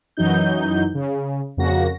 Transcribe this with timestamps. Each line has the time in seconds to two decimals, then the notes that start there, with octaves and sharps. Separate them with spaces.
0.17 F#2 E3 F#3 D#4 G6
0.95 C#3
1.57 F2 C#3 A#3 F#4 A#6